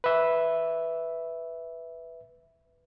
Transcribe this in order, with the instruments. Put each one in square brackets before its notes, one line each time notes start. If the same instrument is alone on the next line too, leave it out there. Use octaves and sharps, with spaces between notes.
[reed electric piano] B4 E5